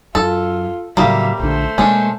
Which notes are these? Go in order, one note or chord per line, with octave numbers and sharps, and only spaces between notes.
F#2 F4 A4
A2 C#3 F#3 G3 A#3 E5 F5
A#1 D3 A3 C5
B2 G#3 A#3 C#4 D4